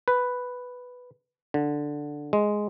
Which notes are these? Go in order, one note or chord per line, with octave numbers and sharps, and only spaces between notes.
B4
D3
G#3